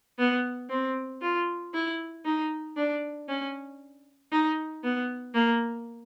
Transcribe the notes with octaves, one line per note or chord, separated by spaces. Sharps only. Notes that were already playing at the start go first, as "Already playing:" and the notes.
B3
C4
F4
E4
D#4
D4
C#4
D#4
B3
A#3